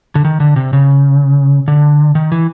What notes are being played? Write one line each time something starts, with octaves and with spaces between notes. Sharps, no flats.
D3
D#3
D3
C3
C#3
D3
D#3
E3